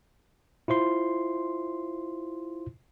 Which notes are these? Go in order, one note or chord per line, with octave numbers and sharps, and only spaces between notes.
E4 F4 C5 C6